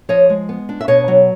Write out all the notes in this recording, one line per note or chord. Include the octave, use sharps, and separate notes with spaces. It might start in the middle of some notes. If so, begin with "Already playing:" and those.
F3 C#5 D#5
G#3
B3
D4
E5
B2 C#5 D#5
F#3